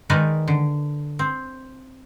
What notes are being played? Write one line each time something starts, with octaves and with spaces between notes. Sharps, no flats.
D#3 G#3 D#4 A#4 B4 D5
D3
C4